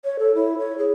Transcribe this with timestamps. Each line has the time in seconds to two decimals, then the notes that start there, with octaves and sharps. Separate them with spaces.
0.05 C#5
0.19 A4
0.35 E4
0.59 C#5
0.78 G#4